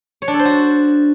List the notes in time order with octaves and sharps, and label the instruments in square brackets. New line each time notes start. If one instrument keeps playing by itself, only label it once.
[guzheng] C#5
D4
A4
C5
F#4